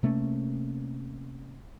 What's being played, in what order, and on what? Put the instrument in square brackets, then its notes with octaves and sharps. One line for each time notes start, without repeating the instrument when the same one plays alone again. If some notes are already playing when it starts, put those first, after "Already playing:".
[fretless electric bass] C3 A3 A#3 C#4